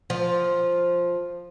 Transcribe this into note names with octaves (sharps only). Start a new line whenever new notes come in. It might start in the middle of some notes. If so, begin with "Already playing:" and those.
F3